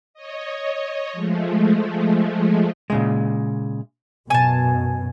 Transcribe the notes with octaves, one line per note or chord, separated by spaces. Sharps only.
C#5 D#5
F3 G#3 A3
A#2 C#3 G#3
F#2 B2 G#5 A5